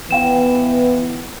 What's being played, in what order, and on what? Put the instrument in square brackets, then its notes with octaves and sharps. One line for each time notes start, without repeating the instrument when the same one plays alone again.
[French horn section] E3 B3 [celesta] F5 G5 E7